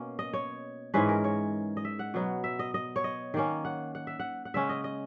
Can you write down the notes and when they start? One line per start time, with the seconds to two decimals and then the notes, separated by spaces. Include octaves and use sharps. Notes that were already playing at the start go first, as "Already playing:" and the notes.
Already playing: B2 A#3 C#4
0.19 D#5
0.33 C#5
0.94 G#2 E3 G#3 C#4 B4
1.09 A#4
1.24 C#5
1.77 D#5
1.85 E5
1.99 F#5
2.14 B2 F#3 B3
2.44 E5
2.59 D#5
2.74 D#5
2.96 C#5
3.04 D#5
3.34 D#3 A#3 C#4
3.65 F#5
3.95 F#5
4.07 E5
4.20 F#5
4.45 F#5
4.54 C#3 G#3 C#4 E5
4.69 D#5
4.84 D#5